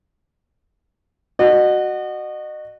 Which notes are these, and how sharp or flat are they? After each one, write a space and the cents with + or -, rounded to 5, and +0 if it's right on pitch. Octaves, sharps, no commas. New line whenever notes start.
F#4 +0 D#5 -35